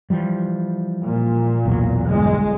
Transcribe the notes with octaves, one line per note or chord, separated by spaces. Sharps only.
E3 F3 G3
A#2
B1 E2 F#3
G1 G#3